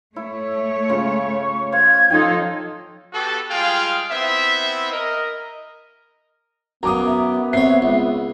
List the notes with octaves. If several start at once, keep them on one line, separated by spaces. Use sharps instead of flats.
A3 E4 C#5
C#3 F4
C#6
C5 F5 G#6
F3 D#4 F4 A4 C#5 G5
B3 F#4 G4 A4
G3 G#3 F4 G#4 F5 G5
B3 C4 E4 E5
A#4 D#5
F#2 B3 F5 A#5 D6 D#6
E5
C3 C#5 C7
C#2